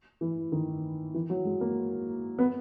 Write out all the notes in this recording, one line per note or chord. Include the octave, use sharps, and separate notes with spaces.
E3
D#3
E3
F#3
G#3
A#3
B3